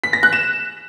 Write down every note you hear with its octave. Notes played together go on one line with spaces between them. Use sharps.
B6
A#6
F#6
E7